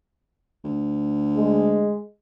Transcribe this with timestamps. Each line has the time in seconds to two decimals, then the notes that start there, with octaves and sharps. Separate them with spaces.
0.64 D2
1.37 G#3